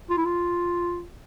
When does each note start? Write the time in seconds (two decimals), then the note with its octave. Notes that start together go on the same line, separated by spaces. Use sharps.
0.10 F4
0.17 E4
0.25 F4